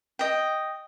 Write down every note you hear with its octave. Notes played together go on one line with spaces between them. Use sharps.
D#5 G5